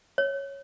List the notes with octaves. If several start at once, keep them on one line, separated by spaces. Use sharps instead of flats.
C#5